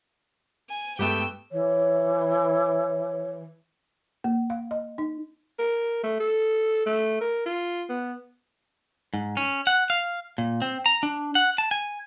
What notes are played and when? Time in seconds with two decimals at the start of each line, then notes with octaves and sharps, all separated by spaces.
0.69 G#5
0.99 G2 G#3 A3 B3 G4 G5 E6
1.52 E3 C#5
4.24 A#3
4.50 F5
4.71 D#5
4.98 D#4
5.59 A#4
6.03 A3
6.20 A4
6.86 A3
7.21 A#4
7.46 F4
7.89 B3
9.14 G#2
9.37 C#4
9.67 F#5
9.90 F5
10.38 A#2
10.62 C4
10.86 A#5
11.03 D4
11.35 F#5
11.58 A5
11.71 G#5